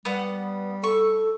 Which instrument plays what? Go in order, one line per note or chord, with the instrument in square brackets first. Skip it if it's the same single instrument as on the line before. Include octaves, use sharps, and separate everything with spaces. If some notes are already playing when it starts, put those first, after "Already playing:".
[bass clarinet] G3 [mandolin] B3 F#5
[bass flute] A4 [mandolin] C#6